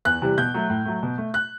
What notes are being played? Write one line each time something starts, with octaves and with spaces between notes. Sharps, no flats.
E2 F#6
C3 E3 G3
B2 G6
F#3 A3
A2
F#3 A3
B2
A3
F#6